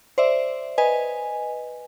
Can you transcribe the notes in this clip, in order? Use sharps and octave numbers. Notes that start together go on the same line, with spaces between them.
C5 D5 E5
B4 D#5 G#5